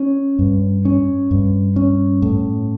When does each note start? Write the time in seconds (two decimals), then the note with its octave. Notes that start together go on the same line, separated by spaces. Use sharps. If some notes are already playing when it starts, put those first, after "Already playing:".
Already playing: C#4
0.39 G2
0.85 C#4
1.31 G2
1.76 C#4
2.22 A2